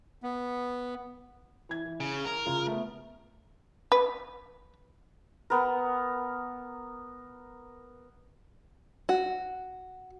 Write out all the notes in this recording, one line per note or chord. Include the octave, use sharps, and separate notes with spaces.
B3
E3 G#6
E3
C#3
A#4
C#3 F4 G#4
A3 B3
B4
B3 A#4
F#4